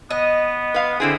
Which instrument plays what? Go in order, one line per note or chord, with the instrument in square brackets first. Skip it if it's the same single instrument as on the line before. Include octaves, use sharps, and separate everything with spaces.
[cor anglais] B3 [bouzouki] D#5
[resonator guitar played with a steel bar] B4 F5
[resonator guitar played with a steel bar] D3 E4 G#4 [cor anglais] C4